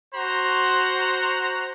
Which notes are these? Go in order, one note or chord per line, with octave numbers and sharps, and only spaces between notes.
F#4 C5 F#5 A#5